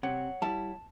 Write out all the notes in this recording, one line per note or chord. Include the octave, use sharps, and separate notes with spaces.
C3 C#5 F#5
G3 E4 A5